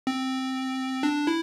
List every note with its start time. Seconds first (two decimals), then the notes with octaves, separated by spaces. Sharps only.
0.07 C4
1.03 D4
1.27 E4